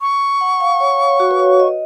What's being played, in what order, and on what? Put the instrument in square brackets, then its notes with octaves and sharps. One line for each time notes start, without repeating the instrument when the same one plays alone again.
[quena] C#6
[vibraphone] F#5
F5
C#5
F#4
B4
C#5
D#5